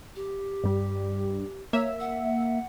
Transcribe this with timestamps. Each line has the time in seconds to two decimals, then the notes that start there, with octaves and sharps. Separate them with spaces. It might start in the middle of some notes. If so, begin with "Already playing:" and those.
0.16 G4
0.64 G2 G3
1.73 A#3 C#5 E5
2.00 F#5